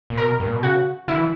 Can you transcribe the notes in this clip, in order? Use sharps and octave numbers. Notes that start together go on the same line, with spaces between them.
A#2
B2 A#4
G2
A#2
B2
C#3 F#4
D3 E4
E3